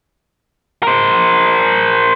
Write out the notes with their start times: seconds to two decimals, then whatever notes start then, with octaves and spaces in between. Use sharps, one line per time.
0.83 A#4 C5